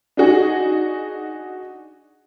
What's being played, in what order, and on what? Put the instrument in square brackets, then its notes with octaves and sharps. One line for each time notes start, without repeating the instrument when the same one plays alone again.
[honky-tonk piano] D4 D#4 F#4 G#4